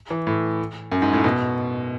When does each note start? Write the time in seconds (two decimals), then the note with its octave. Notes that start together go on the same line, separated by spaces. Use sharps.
0.10 E3
0.27 A2
0.92 F#2
1.02 G#2
1.13 A2
1.24 B2